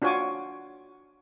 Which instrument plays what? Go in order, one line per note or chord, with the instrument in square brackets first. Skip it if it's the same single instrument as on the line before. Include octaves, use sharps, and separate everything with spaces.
[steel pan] D4 F4 F#4 C#5 G#5 D6